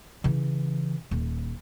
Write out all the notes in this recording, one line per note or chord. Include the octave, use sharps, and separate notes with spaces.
C#3 E3
D#1